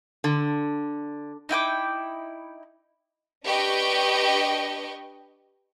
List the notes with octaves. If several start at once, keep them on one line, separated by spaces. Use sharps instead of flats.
D3
D#4 E4 G5 D6
D4 G4 B4 D#5 G5 C#6